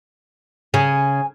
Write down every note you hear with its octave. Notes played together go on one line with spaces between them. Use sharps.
C#3 G#5